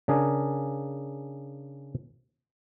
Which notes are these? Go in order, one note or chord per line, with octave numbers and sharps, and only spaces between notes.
C#3 D4 G#4 A#4